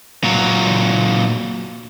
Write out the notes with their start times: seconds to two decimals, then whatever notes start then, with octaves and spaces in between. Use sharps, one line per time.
0.24 A#2 F#3